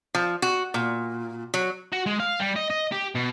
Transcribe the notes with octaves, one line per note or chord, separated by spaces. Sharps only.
F3
F#4
A#2
F#3
F#4
G#3
F5
G3
D#5
D#5
G4
B2